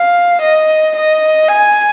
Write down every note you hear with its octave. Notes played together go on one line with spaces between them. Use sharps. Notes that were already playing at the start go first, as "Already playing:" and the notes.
Already playing: F5
D#5
D#5
G#5